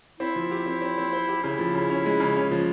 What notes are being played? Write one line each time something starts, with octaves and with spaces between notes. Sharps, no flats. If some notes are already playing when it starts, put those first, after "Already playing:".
C4 E4
F3
G4
C4
C4
C4
C5
G4
C#3 E4
F3
C#3
C#4
G#3
C#3
C#4
F3